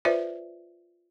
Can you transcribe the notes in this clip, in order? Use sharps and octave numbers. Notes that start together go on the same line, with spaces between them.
F4 B4 C5 D5 E5